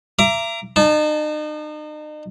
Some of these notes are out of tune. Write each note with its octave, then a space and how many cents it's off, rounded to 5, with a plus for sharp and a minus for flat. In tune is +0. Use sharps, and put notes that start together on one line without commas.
E5 +40 A#5 +0 D6 -5
D#4 -40 A5 -15